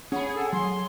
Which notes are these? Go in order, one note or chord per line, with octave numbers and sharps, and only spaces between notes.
C#4 G#4 C#5 F#5 B5
A4
F#3 C6